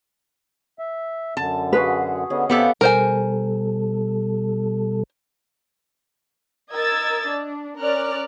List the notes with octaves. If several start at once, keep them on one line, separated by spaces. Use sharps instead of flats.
E5
F#2 D3 A5
F#4 G#4 B4 C6
D3 B3 C#4 G#4 D#5
C3 B3 G4 A4 F5 G5 B5
B2 G3 A4 A#4 C5 G#5
A#4 D#5 E6 G#6 A6
D4
C#4 A#4 D5 F6 F#6